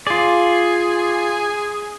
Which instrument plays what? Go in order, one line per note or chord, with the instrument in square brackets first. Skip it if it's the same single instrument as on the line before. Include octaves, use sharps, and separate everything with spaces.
[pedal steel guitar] F4 D5 [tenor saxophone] G#4